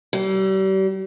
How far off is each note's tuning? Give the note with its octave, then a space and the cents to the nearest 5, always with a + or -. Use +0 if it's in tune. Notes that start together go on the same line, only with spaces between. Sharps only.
G3 -40